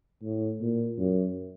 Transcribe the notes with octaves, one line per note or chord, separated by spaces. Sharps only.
A2
A#2
F#2